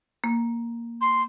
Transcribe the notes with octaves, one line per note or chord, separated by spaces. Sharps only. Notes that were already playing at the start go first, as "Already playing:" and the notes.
A#3
C6